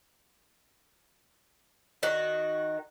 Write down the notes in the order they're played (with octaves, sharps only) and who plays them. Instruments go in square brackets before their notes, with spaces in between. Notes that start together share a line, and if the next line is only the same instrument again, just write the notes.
[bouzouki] D#3 F#4